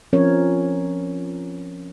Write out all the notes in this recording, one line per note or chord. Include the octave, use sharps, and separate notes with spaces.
F3 C4 C#4 A#4 C#5